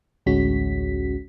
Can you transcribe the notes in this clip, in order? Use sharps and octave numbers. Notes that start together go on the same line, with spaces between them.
A1 D2 G#3 C#4 F#4 B6